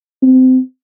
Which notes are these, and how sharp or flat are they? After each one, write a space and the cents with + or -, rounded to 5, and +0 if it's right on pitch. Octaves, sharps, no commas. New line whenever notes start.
C4 -25